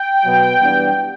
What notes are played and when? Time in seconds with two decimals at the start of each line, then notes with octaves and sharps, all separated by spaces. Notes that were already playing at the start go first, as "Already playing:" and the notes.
Already playing: G5
0.24 B2 F#3 B3
0.61 E3 G3 B3 D4